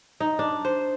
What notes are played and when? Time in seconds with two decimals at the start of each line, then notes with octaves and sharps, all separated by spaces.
0.20 D#4
0.39 D4
0.65 C5